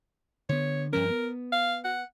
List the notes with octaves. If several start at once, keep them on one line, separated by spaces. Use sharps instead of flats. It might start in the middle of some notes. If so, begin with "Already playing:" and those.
D3 B3 C#5
G2 F3 C#4 A#4
B3
F5
F#5